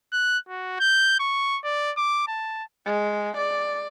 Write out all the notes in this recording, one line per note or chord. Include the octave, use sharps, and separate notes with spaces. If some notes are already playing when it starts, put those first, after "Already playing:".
F#6
F#4
G6
C#6
D5
D6
A5
G#3
D5